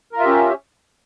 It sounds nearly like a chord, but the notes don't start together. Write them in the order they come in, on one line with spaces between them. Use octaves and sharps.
A#4 F4 E5 G4 C#4